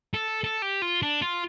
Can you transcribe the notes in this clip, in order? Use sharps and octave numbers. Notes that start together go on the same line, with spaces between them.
A4
A4
G4
F4
D4
F4